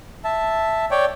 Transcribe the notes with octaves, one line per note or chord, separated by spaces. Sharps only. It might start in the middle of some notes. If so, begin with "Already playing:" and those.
E5 A5
C#5 D5 G5